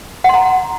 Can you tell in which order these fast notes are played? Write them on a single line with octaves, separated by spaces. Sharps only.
F#5 C6 A#5